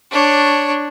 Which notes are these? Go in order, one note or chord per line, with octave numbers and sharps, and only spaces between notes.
D4 C#5